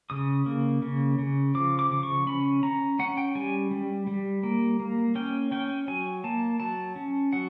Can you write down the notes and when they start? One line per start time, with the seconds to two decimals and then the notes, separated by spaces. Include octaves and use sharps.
0.10 C#3 D#6
0.46 A#3
0.82 C#3
1.19 C#3
1.55 F3 D6
1.79 D6
1.91 C#3
2.03 C#6
2.27 C#4 B5
2.63 C#4 A#5
2.99 C#4 F#5
3.17 G5
3.35 G3 G#5
3.71 G3
4.07 G3
4.43 A#3
4.80 A#3
5.15 C#4 G5
5.51 C#4 G5
5.88 F#3 G#5
6.24 A#3 A5
6.60 F#3 A5
6.96 C#4
7.33 F#3 F#5